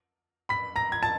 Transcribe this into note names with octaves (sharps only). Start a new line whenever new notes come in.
B5 B6
A#5 A#6
G#6
A5 A6